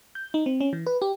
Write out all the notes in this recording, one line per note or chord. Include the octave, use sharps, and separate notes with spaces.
G6
D#4
C4
C#4
E3
B4
G4